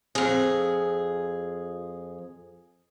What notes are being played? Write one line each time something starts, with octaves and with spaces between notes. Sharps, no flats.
F2 G#4